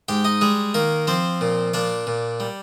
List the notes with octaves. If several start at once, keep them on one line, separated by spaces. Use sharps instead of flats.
G#2 G4 G5
D#4 D#5
G3 G#3 G#4
D#3 A#3 A#4
F3 C4 C5
A#2
A#2 D4 D5
A#2
G3